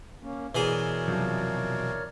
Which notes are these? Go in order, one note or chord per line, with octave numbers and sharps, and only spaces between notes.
A#3 C#4
B2 E3 G#4 A#4 C#5 D5
F#2 C3 F3